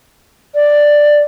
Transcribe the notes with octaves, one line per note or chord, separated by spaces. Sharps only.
D5